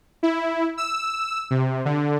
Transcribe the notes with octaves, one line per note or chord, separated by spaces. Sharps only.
E4
E6
C3
D3